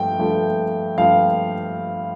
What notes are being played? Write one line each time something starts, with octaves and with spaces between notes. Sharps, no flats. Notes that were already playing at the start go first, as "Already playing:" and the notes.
Already playing: G2 F3 A3 G5
G2 F3 A3
G2 F3 A3 F5